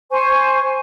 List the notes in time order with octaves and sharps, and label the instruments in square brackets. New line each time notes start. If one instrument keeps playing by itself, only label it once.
[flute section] C5 G#5 C#6